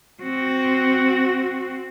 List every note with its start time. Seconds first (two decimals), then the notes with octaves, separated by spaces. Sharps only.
0.23 C4 F#4